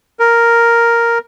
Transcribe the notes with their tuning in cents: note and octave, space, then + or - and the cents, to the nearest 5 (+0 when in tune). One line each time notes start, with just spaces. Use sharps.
A#4 +0